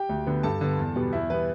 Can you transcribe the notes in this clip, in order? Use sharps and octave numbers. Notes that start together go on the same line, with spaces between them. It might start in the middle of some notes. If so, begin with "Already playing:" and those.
Already playing: G4 G5
D2
D3 B3
G2 A4 A5
D3 B3
E2
B2 G3 B3
E2 E4 E5
E3 G3 B3 B4